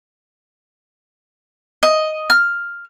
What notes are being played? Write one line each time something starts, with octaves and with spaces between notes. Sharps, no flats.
D#5
F6